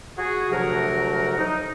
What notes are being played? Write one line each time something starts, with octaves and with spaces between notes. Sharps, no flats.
F#4 G#4
D2 C3 F3 F#3 F#4 A#4
D#4